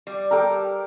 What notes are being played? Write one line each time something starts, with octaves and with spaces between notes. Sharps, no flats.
G3
G4 A4 A#4